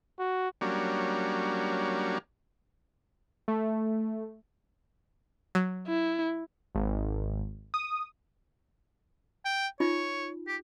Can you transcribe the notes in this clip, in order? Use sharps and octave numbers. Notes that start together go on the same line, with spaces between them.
F#4
F#3 G3 A#3 C#4 D4
A3
F#3
E4
G#1
D#6
G5
D#4 F4 C#5
G4